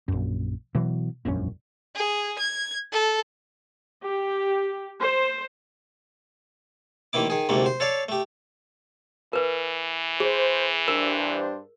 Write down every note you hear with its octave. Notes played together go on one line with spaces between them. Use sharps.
A#1 F#2
B2 E3 F#3
E1 A#1 F#2 C#4
G#4
G#6
A4
G4
C5
A1 D#3 A#3 E4 D6
D#3 G#4
D2 G#2 C3 A3 A#3
C5
A4 C#5 D5 F5
A3 G4
E3 A#4 B4
G#4 C5
G2 D4 A#4 C5